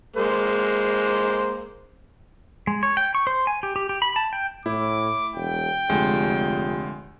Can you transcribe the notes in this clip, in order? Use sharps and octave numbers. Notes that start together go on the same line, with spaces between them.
G#3 A#3 C5
G#3
C#5
G5
C#6
C5
G#5
G4
G4
G4
B5
A5
G5
A2 E4 D6
E1 G5
F1 D2 G#3